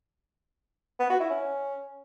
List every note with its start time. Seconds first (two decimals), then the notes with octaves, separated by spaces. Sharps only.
0.99 B3
1.10 F#4
1.20 E4
1.30 C#4